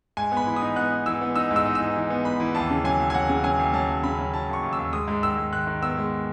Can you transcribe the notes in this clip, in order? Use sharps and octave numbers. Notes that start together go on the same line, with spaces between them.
G#2 G#5
B3
B5
E3
D#6
D#4
B3 F#6
D#4
E3 E6
B3
D#4 E6
G#2
E6
D#4
E6
E3
E3
B3
B3 B5
E3
D#2 A5
C#3
F#3 G#5
D#2
G#5
F#3 F#5
C#3
F#3 G#5
D#2
F#3 A5
D#2
C#3 B5
F#3
F#3 A5
D#2 C#6
D#2
E6
D#2
G#3 D#6
G#2
D#3 E6
G#2
D#3 F#6
D#3
B3 E6
G#3